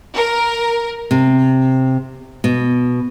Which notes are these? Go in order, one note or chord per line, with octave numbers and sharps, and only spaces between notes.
A#4
C3
B2